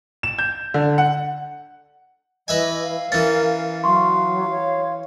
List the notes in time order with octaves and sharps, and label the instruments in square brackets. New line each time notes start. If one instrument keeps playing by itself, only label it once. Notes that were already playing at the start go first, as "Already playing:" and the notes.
[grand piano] E7
G6
D3
F#5
[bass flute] E3 [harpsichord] B4 E5 G#5 [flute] D#5
[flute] F5
[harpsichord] E3 C#4 [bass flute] A#4 [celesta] A6
[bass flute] F#3 [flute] F5 [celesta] C6 C#6
[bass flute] C#5